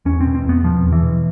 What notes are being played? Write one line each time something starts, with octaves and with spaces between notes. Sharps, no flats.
E2 C#4
B2 C4
C4
E2
B3
B2 F3
E2
E3
B2